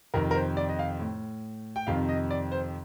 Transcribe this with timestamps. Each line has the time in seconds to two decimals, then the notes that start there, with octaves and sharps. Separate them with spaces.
0.14 F2 C3 D#3 A#4
0.31 A#4
0.35 C5
0.57 D5
0.69 D#5
0.79 F5
1.00 A2
1.76 G5
1.87 F2 C3 D#3 F5
2.09 D#5
2.31 D5
2.52 C5